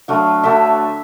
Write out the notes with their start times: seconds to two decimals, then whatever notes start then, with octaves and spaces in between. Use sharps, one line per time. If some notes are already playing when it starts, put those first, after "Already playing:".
0.08 D3 F#3 A3 F5
0.43 D3 F#3 A3 E5